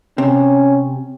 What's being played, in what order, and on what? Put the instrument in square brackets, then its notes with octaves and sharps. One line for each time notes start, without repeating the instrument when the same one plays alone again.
[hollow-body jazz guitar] C3 [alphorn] C#4